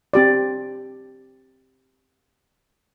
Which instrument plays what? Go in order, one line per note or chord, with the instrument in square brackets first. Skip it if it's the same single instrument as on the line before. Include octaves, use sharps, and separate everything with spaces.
[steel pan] C4 G4 D5